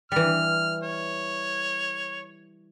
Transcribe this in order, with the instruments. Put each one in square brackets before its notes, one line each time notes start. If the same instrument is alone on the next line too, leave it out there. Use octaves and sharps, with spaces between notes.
[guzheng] E3 G3 [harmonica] F6
[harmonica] C#5